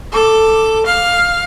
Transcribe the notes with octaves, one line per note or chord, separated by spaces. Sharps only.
A4 D6
F5